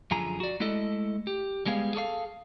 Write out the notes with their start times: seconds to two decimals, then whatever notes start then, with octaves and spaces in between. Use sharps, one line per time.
0.11 F#2 D3 F3 G#4 A#5
0.40 F#4 D5
0.60 G#3 A3 E4 A4 D#5
1.27 G4
1.66 G3 G#3 B3 G#4 F5
1.95 G#4 A4 C#5 F5